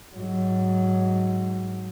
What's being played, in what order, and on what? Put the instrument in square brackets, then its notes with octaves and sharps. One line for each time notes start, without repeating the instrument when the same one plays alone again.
[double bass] G#2 F#3